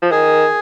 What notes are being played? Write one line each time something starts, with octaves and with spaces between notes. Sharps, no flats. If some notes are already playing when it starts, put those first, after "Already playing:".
F3
D#3 G#4